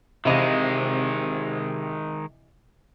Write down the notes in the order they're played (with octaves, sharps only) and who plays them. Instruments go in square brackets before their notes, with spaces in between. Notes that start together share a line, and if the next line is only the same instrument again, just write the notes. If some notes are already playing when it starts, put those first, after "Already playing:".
[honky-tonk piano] C3 C4 F7 [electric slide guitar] D#3 G#3 [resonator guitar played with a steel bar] E3 D#5 F5